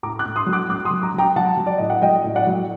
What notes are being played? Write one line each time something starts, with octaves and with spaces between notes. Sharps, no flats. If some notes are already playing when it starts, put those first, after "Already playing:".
A2 A#5 D6
D6 F#6
A2
C6 D#6
F#3
D6 F#6
F#3 D6 F#6
C6 D#6
F#3
A#5 D6
F#3 G5 A#5
F#3 F#5 A5
F#3
D5
A2 D#5
F#5
F#3 D#5 G5
A2
D5 F#5
F#3